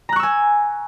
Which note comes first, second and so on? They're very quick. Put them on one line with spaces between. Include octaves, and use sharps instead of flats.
A#5 F#6 C#6 E6 G#5